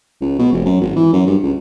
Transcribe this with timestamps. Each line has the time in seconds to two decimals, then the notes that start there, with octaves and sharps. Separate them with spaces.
0.21 C#2
0.39 B2
0.52 F1
0.66 F#2
0.81 G#1
0.96 E3
1.13 F#2
1.26 G2
1.42 C#2